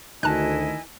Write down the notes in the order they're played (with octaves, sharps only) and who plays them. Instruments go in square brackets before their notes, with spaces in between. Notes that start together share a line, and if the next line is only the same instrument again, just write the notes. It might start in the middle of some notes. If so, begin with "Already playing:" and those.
[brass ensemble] D2 [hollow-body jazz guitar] D#3 D#4 [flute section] E4 D#5 G#5 [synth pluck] A5 F#6